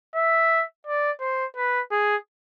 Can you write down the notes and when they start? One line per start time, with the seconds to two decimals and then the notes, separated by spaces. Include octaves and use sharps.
0.15 E5
0.86 D5
1.21 C5
1.56 B4
1.91 G#4